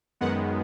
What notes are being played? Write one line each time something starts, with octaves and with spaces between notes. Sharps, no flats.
F#2 D#3 G#3 B3 F#5